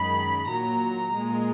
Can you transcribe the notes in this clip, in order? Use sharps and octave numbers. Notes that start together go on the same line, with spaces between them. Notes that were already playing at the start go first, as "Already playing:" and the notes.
Already playing: F#2 D#3 G#3 B5
A#2 F#3 A#5
A#2 G#3